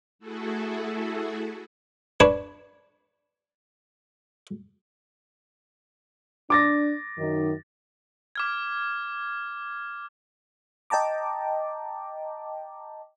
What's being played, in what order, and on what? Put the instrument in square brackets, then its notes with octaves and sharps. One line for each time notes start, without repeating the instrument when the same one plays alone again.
[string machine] A3 E4 F#4 G#4 A4
[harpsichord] D4 B4 C#5
[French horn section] D4 [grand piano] D6 A6 A#6
[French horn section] F#2 D#3 D#4
[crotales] D6 F6 G#6
[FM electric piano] D#5 G5 A5 A#5 D6